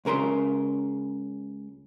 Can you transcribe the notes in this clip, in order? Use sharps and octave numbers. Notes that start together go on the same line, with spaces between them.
C#2 C#3 A#4 B5 C6